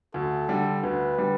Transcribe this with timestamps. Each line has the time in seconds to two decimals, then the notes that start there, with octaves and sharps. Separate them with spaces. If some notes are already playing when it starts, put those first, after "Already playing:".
0.14 D2 A4
0.49 D3 G3
0.83 D2 B4
1.18 D3 G3